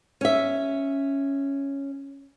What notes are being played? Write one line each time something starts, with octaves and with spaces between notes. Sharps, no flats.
C#4 E5